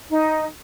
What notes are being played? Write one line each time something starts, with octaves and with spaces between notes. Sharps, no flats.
D#4